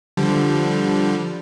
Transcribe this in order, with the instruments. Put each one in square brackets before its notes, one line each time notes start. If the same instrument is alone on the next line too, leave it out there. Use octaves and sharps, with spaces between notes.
[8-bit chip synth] D3 F3 G3